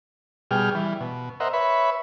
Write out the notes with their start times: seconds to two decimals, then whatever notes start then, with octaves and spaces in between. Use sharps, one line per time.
0.51 B2 G3 G#4 G5 F6
0.75 E3 G3
1.00 B2
1.40 A#4 C5 D#5 E5 F#5
1.53 B4 C#5 E5 B5